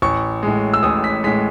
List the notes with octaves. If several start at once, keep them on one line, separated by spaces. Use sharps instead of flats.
A1 C#6
A2 G#3
E6
A1 D#6
B6
A2 G#3 B6